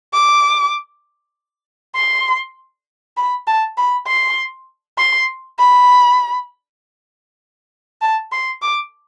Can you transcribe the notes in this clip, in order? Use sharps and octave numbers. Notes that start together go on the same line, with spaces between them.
D6
C6
B5
A5
B5
C6
C6
B5
A5
C6
D6